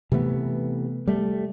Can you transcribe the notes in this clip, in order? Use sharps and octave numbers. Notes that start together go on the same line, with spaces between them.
C3 E3 A3 B3
G3 A3